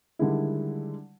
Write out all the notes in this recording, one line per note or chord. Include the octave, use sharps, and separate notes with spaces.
D3 D#3 G3 G#3 E4